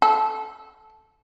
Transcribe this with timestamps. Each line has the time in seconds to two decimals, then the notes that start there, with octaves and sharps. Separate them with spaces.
0.02 A4